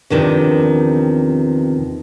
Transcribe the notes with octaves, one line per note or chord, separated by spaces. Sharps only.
E2 C3 D#3 F3 D4